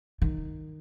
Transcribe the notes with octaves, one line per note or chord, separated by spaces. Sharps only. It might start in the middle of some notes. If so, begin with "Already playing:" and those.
D#3